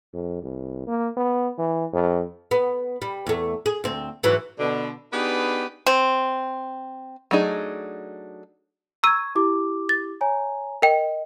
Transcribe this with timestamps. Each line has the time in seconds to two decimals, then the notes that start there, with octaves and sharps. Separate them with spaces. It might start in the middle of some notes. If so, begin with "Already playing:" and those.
0.14 F2
0.43 C2
0.87 A#3
1.17 B3
1.58 E3
1.93 F2
2.51 B3
3.02 G3
3.27 E2 A3
3.66 G#4
3.84 D2 C4
4.23 G#2 E3 F#3
4.59 B2 D3
5.12 B3 D4 D#4 G4 G#4 B4
5.86 C4
7.31 F#3 A3 D4 D#4 G#4
9.03 A#5 C#6 E6 G#6 D#7
9.35 E4 G4 D6
9.89 A6
10.21 C#5 G#5 A#5
10.82 A#4 D#5 G5